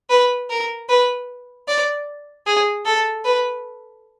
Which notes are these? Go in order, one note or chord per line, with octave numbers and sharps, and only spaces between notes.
B4
A#4
B4
D5
G#4
A4
B4